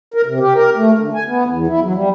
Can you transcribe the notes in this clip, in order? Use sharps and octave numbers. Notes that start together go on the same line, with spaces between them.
A#4
C3
G4
A#4
A3
D3
G#5
B3
E2
E4
F#3
G3